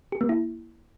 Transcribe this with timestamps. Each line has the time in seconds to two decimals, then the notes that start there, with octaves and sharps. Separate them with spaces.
0.12 G4
0.21 A#3
0.29 E4